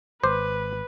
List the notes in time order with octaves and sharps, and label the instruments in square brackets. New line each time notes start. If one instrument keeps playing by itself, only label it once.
[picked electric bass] G#1 [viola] B4 [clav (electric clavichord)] C5 [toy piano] D6